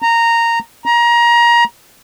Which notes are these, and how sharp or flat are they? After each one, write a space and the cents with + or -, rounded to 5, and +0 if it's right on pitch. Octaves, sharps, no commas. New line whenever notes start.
A#5 -10
A#5 +25